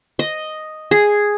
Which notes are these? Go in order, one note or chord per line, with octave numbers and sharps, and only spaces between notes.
D#5
G#4